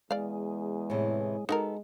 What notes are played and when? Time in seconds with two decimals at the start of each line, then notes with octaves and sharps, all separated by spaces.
0.11 E2 G#3 D5 F5
0.90 A2 C3 E3
1.49 G#3 B3 D#4 F#4 A4 A#4